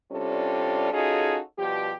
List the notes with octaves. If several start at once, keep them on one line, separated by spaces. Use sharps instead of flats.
C3 G3 C#4 D4 F4 A4
C#4 D#4 F4 F#4 G#4 A4
B2 F3 G3 G4